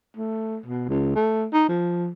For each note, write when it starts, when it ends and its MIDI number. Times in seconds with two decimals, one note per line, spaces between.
0.17 0.58 57
0.66 0.88 47
0.89 1.14 37
1.15 1.46 57
1.53 1.67 63
1.69 2.10 53